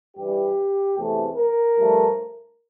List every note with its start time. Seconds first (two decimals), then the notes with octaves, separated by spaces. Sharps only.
0.16 G2 E3 G3 G4
0.97 E2 C3 E3 A3
1.37 A#4
1.78 G2 F3 A3